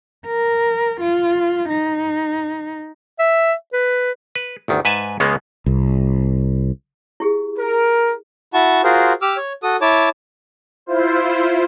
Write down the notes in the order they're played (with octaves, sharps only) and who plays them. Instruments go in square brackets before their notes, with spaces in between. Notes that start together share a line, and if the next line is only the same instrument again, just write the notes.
[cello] A#4
F4
D#4
[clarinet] E5
B4
[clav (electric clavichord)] B4
G1 D2 D#3
G#2 B4 E5 G#5 A5
C#2 C#3 G#3 A#3 B3
[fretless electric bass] C2
[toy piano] E4 G4 G#4
[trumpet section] A#4
[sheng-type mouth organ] E4 F#4 F#5 A5 C#6
F4 F#4 G#4 A#4 C5
G4 D6 E6 F6
C#5
F#4 A4 D#6
E4 C#5 A5 D6
[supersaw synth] E4 F4 C5